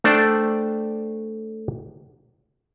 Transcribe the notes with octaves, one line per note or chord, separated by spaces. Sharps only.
A3 D4 C5 D5 G5 A5